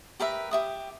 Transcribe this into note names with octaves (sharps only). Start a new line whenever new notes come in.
G4 A#4 B4 E5
G4 E5 D#6